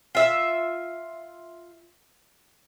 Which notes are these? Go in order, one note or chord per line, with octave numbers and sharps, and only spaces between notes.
F4 E5